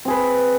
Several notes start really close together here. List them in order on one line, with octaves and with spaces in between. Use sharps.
C4 G#4 B4